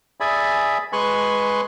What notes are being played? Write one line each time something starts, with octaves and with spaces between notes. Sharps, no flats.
G#4 D5 E5 G#5 B5
G#3 B4 G#5 C6 C#6 F#6